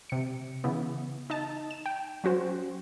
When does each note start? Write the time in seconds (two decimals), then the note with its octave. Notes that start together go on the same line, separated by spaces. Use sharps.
0.10 C3 C#7
0.64 C#3 E3 B3
1.30 D#4 D#5 A5
1.71 E7
1.86 G5
2.24 F#3 C#4 F#4 C5